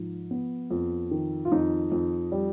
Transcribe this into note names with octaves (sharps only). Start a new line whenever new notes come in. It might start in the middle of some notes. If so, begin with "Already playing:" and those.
Already playing: G#2 F3
B3
F2
D#3
F4
F2 D#4
F2
G3